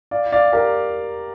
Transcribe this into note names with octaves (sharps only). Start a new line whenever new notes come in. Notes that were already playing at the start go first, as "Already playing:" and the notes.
D5 F5
D5 F5
G4 A#4